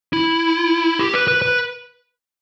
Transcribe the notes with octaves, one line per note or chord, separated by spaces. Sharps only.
E4
G4
B4
B4
B4